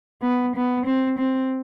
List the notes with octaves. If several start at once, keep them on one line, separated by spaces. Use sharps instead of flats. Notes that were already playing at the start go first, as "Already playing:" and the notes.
B3
B3
C4
C4